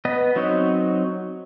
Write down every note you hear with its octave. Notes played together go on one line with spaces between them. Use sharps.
B3 B4 D#5
F#3 C4 D#4 C#5 D#5